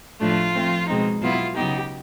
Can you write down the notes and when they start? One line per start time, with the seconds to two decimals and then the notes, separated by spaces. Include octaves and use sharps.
0.20 A2 F3 A3 D4 F4
0.55 F3 A3 C4
0.89 B2 G#3 C4 D#4
1.21 B2 F#3 B3 E4 F4
1.55 C#3 F#3 B3 D#4 G4